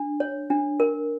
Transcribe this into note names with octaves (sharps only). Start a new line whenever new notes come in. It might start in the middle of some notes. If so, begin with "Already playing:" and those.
Already playing: D4
C#5
D4
A#4